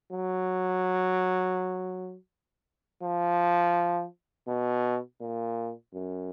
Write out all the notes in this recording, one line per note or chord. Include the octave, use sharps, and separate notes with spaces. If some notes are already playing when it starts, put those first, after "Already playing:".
F#3
F3
B2
A#2
F#2